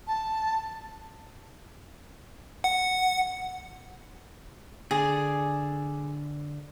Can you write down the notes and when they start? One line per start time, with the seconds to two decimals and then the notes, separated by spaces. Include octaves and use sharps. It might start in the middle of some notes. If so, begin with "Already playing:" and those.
0.07 A5
2.64 F#5
4.91 D3 G#4 D5 G#5